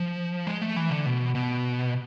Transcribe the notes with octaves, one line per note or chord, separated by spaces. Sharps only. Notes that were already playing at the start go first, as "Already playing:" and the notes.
Already playing: F3
G#3
A3
E3
D3
B2
B2